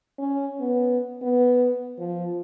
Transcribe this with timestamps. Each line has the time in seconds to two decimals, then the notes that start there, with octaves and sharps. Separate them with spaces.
0.19 C#4
0.60 B3
1.22 B3
1.99 F3